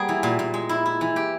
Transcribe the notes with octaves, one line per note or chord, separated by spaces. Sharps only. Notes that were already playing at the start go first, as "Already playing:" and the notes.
Already playing: G3 A#3 B3 G#4
E3
A#2
A#2
G#3
E4
E4
E3
G4